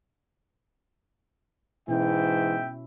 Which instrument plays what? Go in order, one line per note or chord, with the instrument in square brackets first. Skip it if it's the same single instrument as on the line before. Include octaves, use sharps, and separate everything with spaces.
[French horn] G#2 [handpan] B2 C#4 E4 [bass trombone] E3 [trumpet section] E5 G5